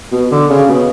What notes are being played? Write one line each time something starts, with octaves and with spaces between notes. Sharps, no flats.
B2
D3
C#3
B2